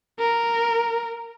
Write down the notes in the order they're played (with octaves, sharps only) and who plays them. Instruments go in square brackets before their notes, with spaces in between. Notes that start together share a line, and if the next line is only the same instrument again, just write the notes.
[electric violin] A#4